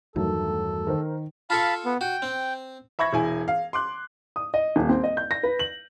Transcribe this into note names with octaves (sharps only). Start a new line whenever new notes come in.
E2 G2 D#3 F#3 A3 A4
D#3 A#4 C5
F4 A4 F5 A5 B5 C#6
B3
F#4 G5
C4
E5 B5 C#6 G#6 A#6
E1 E4 G#5
F5
C6 D6 F#6
D#6
D#5
D#1
C4
D#5
G6
A#6
B4
F#7